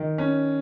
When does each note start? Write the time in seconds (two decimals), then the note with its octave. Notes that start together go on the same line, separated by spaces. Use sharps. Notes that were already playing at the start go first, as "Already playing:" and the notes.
Already playing: D#3
0.18 C#4